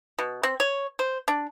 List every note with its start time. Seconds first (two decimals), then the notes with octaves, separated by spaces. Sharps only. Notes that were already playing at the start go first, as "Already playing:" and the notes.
0.19 B2
0.43 C4
0.60 C#5
0.99 C5
1.28 D4